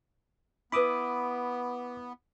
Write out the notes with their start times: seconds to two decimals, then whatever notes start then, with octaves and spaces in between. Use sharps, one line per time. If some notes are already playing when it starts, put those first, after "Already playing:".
0.72 B3 E4 B4 B5 D6 D#6